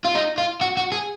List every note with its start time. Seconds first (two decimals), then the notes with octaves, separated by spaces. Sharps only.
0.05 F4
0.15 D#4
0.38 F4
0.61 F#4
0.77 F#4
0.92 G#4